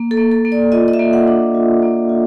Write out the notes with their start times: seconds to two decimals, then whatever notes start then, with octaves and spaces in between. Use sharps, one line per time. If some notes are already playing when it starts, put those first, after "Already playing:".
Already playing: A#3
0.11 A4
0.17 A#3
0.32 A4
0.45 A#3
0.52 D5
0.72 F4 D#5
0.88 D#5
0.93 E5
0.99 A#3
1.13 F#5
1.27 D4
1.55 F4
1.82 A#3
2.09 F4